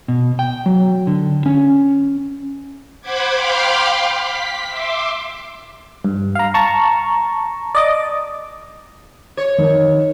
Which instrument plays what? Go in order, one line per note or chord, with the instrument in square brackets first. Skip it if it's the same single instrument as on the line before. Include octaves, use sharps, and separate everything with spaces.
[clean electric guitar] B2
G5
F#3
D3
C#4
[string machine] C5 F#5 B5 D6 G#6
F5 G5 B5 C6 D6 F6
B6
E5 C6 D6
[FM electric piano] G2
F5 A#5
A5 A#5 C#6
D5 D#5 D6
[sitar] C#5
[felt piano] D#3